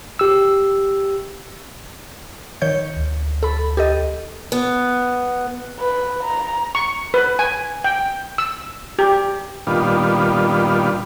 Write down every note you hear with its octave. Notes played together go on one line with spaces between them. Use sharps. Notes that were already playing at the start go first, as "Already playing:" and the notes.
G4 E6
D#3 C#5 G6
D2
A4 B5
G4 A4 D#5
B3
B4
A#5
C#6
B4
G#5
G5
E6
G4
A#2 D#3 G3 B3 D4 F4